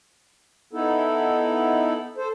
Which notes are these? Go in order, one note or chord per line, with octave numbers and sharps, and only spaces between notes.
B3 D#4 E4 A4
A4 C5